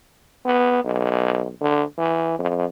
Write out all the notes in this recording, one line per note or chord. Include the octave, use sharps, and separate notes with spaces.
B3
B1
D3
E3
F2